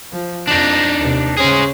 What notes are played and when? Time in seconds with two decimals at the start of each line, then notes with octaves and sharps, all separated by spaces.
0.12 F3
0.48 F2 D4 D#4
0.99 D#2 C3
1.37 C#3 C#4 G#4 C5